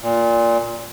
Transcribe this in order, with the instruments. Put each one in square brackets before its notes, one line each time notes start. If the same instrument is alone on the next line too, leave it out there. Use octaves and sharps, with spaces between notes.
[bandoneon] A#2